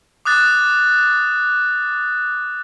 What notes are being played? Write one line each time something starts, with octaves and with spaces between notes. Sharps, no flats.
D6 D#6 F#6 A6